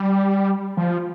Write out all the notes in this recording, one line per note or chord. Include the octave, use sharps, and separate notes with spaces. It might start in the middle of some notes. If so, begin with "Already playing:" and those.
Already playing: G3
F3